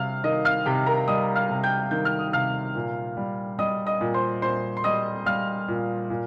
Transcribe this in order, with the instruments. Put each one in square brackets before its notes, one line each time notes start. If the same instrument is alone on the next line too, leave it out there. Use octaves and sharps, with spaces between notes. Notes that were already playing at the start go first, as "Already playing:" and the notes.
Already playing: [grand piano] C3 G3 F5 F6
D#3 D#5 D#6
F5 F6
C3 G4 G5
A#4 A#5
G3 D#5 D#6
F5 F6
C3
G5 G6
D#3 G6
F6
D#6
C3 F5 F6
A#2
G3
G3 D#5 D#6
D#5 D#6
A#2
C5 C6
A#2 C5 C6
C6
G3 D#5 D#6
G3 F5 F6
A#2
A#2